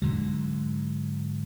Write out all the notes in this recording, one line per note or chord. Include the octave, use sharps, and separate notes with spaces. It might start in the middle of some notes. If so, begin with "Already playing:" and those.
G#2 D3 F#3